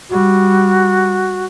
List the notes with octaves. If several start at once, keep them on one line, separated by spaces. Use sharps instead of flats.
G3 F#4